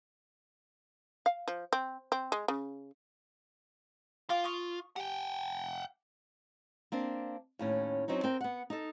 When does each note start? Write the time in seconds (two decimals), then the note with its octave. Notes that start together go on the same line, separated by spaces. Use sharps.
1.26 F5
1.48 F3
1.73 C4
2.12 C4
2.32 G#3
2.48 C#3
4.30 F4 F5 G5 D6
4.44 C#6 D#6
4.96 G4 F#5 G5
6.92 A#3 C4 D4
7.59 D#2 A2 C#4
8.08 F#3 C4 C#4 D#4
8.24 C4 A#4 G5
8.41 B3 F#5
8.70 D#4 A4